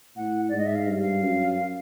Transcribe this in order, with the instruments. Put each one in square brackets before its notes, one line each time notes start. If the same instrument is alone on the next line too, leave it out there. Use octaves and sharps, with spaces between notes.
[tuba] A2 [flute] F#5
[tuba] G#2 [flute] D5
[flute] D#5
E5
F5
[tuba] G2
[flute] F5
[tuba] F#2